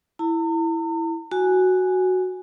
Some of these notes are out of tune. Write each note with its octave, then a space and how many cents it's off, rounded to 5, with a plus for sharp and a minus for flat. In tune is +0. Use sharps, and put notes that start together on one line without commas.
E4 +0 A#5 -45
F#4 +0 G#5 +0